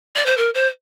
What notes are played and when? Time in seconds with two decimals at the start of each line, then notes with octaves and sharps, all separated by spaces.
0.16 D5
0.26 C5
0.37 A#4
0.54 C5